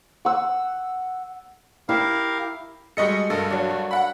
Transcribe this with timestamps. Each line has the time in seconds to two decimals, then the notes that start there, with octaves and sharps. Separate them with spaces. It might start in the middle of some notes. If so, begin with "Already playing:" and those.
0.25 F#5 E6
1.89 E4 G4 A#4 F5
2.97 G3 G#3 F#4 A4 D#5 C#7
3.30 G2 A4 A#4 D#5
3.50 F#3 D4
3.71 F#4
3.91 F#5 B5